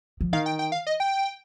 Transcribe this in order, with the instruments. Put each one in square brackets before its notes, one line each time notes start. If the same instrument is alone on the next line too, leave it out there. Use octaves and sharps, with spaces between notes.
[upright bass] F3
[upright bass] D#3 [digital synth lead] F5
[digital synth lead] G5
G5
F5
D#5
G5